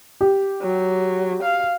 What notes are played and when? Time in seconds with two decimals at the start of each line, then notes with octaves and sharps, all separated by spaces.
0.21 G4
0.62 F#3
1.43 F5